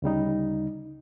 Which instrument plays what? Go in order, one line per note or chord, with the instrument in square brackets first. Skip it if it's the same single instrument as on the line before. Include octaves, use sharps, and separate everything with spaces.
[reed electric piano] D2 C#3 G3 D#4